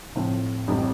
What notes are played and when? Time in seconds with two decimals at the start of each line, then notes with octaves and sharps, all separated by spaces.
0.15 A2 F3 C4
0.68 A1 A2 G3 C4